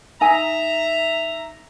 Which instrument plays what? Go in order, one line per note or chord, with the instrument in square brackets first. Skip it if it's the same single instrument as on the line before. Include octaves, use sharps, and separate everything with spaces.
[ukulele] D#4 G#5 [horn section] E5 A#5